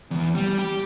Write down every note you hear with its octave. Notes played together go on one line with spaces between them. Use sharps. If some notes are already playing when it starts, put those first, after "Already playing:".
E2
G3
G4